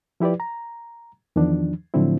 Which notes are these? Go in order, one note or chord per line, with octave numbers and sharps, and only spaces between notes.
F3 E4 G4 B4 D5
A#5
E2 D#3 F3 D4
A2 D3 F3 F#3 C4 E4